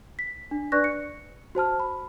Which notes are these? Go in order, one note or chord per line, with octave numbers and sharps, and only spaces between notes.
B6
D4
D4 B4 D5 C#6 F#6 A#6
C#7
F#4 C5 A5 F6
B5